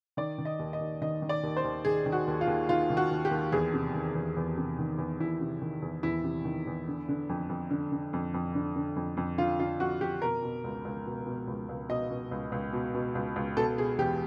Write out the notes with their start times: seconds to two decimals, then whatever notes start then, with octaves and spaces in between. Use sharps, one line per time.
0.17 D#3 D5
0.38 D#3
0.45 D#5
0.59 D#2
0.73 D#5
0.81 D#2
1.01 D#3 D#5
1.22 D#3
1.29 D5
1.43 D#2
1.57 C5
1.64 D#2
1.85 D#3 G#4
2.06 D#3
2.12 F#4
2.27 D#2
2.41 F4
2.47 D#2
2.69 D#3 F4
2.90 D#3
2.97 F#4
3.11 D#2
3.25 G4
3.31 D#2
3.52 E2 G#4
3.74 C3
3.94 D#3
4.15 E2
4.37 E2
4.58 C3
4.79 D#3
4.98 E2
5.20 E2 E4
5.41 C3
5.62 D#3
5.82 E2
6.03 E2 E4
6.24 C3
6.45 D#3
6.67 E2
6.88 D3
7.09 D3
7.29 F2
7.49 F2
7.71 D3
7.92 D3
8.13 F2
8.34 F2
8.55 D3
8.76 D3
8.96 F2
9.17 F2
9.38 D3 F4
9.59 D3 F4
9.80 F2 F#4
10.01 F2 G4
10.22 B2 A#4
10.43 B2
10.64 C#2
10.85 C#2
11.06 B2
11.27 B2
11.48 C#2
11.69 C#2
11.89 B2 D#5
12.11 B2
12.31 C#2
12.52 C#2
12.73 B2
12.94 B2
13.15 C#2
13.36 C#2
13.57 B2 A4
13.78 B2 G#4
13.98 E2 G4